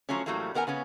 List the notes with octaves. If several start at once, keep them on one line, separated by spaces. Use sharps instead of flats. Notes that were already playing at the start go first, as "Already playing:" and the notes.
F3 F#3 A3 C#4
A2 E3 F#3 G3 A3 A#3
D#3 B3 A#4 F#5 G#5
C#3 B3 C#4